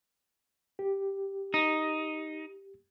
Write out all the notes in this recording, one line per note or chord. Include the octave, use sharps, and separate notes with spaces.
G4
D#4